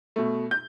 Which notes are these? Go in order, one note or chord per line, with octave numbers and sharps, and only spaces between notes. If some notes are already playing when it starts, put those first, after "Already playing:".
B2 A3
G6